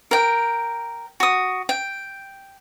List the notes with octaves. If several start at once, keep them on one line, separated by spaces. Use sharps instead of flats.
A#4 G5
F#4 D#6
G5